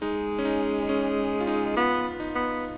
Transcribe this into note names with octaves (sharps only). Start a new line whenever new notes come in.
G#3 D#4
C#4
D#4
C#4
F4
D#4
B3 F4
D#4
B3